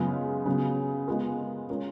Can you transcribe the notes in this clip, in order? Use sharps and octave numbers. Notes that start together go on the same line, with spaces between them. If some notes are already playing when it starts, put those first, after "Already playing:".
Already playing: F#2 C#3 G#3 B3 F4
C#3 F#3 B3
G#3 B3 F4 A#4
G#3 C#4 F4 A#4